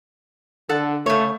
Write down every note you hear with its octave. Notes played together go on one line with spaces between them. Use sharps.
D3 A4 F#5
C#3 A3 C#5